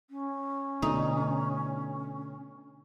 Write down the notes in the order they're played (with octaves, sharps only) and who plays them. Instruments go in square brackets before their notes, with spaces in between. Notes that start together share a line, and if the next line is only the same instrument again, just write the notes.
[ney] C#4
[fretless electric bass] B2 D3 A3 [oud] D#4